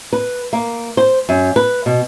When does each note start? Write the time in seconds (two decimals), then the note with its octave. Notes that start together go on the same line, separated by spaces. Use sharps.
0.13 B4
0.53 A#3
0.97 C5
1.29 F#2
1.56 B4
1.86 B2